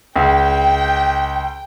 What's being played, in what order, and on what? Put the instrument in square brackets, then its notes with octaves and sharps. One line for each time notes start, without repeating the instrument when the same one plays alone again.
[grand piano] C#2 [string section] G5